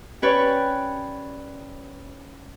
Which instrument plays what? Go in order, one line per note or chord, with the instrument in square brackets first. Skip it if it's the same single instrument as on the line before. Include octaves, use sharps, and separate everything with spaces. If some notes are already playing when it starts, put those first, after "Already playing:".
[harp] C#4 G4 B4 C#5 D5